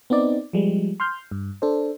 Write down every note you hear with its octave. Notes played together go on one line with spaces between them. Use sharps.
B3 C4 D#4 D5
F3 G3 G#3
C6 F6 G6
G2
D4 A4 C5